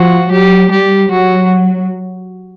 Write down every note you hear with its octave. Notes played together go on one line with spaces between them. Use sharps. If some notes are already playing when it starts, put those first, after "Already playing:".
Already playing: F3 F#4
F#3 G4
G3 G4
F#3 F#4